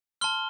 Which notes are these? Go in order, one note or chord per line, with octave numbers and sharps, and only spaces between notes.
A5 C6 F6 G7